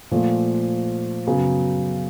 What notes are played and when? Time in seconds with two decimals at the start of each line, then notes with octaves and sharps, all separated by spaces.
0.11 A#2 F3 A3
1.27 F#2 C#3 F#3 B3